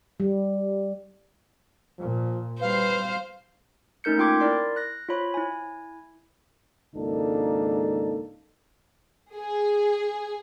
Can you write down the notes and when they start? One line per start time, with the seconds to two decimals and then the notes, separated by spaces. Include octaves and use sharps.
0.20 G3
1.99 A#2 F3
2.61 G3 B4 C5 F5
4.04 A3 C#4 D#4 A#4 G6 C#7
4.18 A#3 F4 G5 C6 D6 G#6
4.40 E4 A#4 D5 C6
4.76 F#6 A#6
5.09 F4 C5 C#5 B5
5.34 E4 G#5
6.95 G#1 C#2 A#3 D4 D#4 A4
9.33 G#4